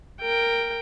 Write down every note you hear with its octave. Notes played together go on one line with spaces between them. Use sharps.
A#4 G5